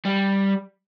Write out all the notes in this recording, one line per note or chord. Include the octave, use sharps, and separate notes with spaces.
G3